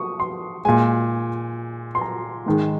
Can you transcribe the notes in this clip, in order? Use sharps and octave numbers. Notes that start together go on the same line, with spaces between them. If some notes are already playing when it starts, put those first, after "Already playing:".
Already playing: C#6 D#6
C6
A#2 G#3 G#5
C6
A#5
G#2 D#3 G#3